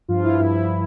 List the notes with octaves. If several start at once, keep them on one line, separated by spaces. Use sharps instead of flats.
G2 F3 F4
E4
G2 F3 E4